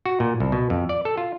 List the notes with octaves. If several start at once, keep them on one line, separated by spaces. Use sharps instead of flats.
F#4
A#2
C2
B2
F2
D5
A4
F4